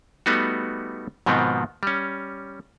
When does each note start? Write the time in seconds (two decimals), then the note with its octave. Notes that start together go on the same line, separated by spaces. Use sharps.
0.26 G3 A3 B3 D#4 F#4
1.26 G#2 B2 D#3 F3 B3 C4
1.83 G3 C#4